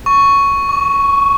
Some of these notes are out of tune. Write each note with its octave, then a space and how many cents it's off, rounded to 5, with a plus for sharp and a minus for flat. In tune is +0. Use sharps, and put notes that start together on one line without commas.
C#6 +5
C#6 +40